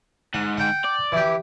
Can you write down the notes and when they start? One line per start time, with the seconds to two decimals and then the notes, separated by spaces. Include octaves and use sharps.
0.34 G#2 F#5
0.58 F#5 G5
0.84 D5
1.12 E3 G4